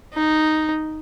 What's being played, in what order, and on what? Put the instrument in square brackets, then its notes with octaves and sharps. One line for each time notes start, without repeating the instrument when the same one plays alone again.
[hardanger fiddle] D#4